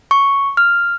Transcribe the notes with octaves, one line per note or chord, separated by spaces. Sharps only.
C#6
F6